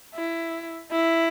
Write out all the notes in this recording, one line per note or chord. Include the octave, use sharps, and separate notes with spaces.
E4
E4